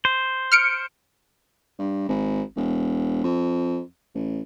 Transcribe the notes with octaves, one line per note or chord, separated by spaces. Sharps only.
C5
F6 C#7 D7
G2
G#1
E1
F2
A1